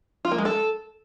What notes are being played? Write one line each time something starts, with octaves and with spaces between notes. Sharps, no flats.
F4
A#3
G#3
A4